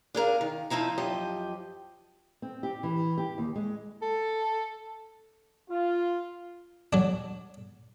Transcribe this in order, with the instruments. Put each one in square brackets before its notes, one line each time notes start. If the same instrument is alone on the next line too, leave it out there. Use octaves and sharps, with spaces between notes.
[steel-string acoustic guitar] D4 G#4 A#4 F5
D#3
F2 F3 D#4 E4 A#5
F#2 F3 G4 D#5
[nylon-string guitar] C4
G4
E3
G4
D#2
G#3
[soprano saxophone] A4
[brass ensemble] F4
[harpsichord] F#3 D4